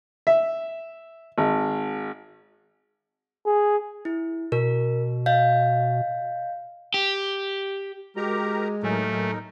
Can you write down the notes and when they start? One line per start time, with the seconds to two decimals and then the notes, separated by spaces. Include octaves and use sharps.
0.27 E5
1.38 G#1
3.46 G#4
4.05 E4
4.52 B2 A#4
5.26 D#5 F5 G6
6.94 G4
8.16 G#3 F#4 G4 A#4 A#5 D6
8.83 D#2 A2 F#3 A3 D#4 A#4 G#5